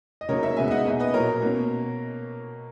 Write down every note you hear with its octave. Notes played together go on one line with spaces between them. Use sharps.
D#5
C#3 F#3 A#3 D#4 A#4 C#5
C#5 E5
C#3 G#3 B3 D#4 E5 G#5
E5
D#5 F#5
B2 A#3 D#4
B4 D#5
A#2 F#3 A#3 A#4 C#5
B2 A#3 C#4